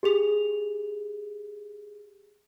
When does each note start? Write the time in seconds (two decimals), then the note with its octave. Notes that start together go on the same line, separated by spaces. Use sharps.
0.03 G4 G#4 F7